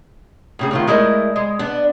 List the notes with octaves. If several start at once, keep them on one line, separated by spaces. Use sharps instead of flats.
A2 C#3 G#4
A2 D#3 F4
G#3 A3 E4 A#4 D5 D#5
G#3
B3 D4